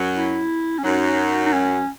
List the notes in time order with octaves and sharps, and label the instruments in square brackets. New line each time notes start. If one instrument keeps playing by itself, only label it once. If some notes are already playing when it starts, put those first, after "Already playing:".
Already playing: [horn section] F#2 F#3
[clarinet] E4
C#4
[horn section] F#2 F#3 [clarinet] D#4
[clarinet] D#4
C#4